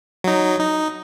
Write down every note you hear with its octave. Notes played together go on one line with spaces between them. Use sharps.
F#3 D#4
D#4